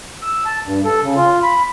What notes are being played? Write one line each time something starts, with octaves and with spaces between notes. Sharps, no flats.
E6
A5
G2
A4
C#3
F4
B5